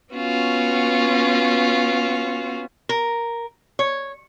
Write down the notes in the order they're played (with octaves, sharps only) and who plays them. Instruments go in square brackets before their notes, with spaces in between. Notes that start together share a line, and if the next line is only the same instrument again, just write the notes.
[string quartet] B3 C#4 F4 F#4
[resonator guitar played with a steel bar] A#4
C#5